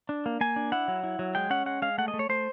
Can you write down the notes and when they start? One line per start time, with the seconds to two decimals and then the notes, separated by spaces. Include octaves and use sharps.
0.09 D4
0.26 A#3
0.41 A#3 G#5
0.56 D4
0.72 E4 F#5
0.88 F#3
1.03 E4
1.19 F#3
1.35 G#3 G5
1.50 C#4 F#5
1.66 G#3 F#5
1.82 G#3 F5
1.98 A3 F#5
2.08 D#5
2.14 A3
2.19 C#5
2.29 A3 C5